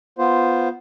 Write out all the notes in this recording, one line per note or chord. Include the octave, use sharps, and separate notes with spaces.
B3 F4 C5